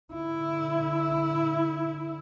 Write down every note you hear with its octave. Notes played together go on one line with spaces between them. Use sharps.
D3 E4